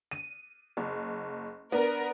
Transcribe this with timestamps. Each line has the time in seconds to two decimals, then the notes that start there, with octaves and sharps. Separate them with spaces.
0.11 D#7
0.77 F#1
1.72 B3 D4 A#4